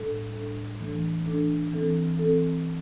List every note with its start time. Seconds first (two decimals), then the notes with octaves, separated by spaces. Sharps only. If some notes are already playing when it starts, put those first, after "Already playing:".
Already playing: A2 G3 D4 A4
0.33 A2 G3 D4 A4
0.80 E3 A3 D4 A4
1.26 E3 A3 D4 A4
1.72 E3 C4 A4
2.19 E3 C4 A4